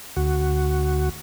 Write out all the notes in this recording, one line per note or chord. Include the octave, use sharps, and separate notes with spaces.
D2 F#4